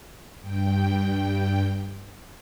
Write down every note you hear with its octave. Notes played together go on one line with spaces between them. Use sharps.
G2 G5